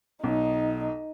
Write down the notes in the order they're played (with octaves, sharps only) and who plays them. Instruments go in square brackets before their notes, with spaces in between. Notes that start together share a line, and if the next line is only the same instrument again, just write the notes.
[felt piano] B1 [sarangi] D#4